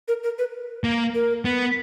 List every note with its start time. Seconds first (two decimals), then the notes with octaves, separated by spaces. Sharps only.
0.08 A#4
0.23 A#4
0.39 B4
0.84 A#3
1.15 A#4
1.45 B3